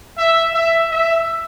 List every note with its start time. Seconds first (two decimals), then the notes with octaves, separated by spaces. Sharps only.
0.18 E5
0.54 E5
0.91 E5